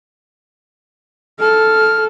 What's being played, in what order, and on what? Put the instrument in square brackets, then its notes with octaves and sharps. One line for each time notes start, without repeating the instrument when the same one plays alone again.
[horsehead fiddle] A4 [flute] F6